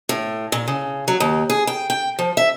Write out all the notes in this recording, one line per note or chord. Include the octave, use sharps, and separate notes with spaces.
A2
A#2
C#3
F#3
D#2
G#4
G5
G5
F3
E5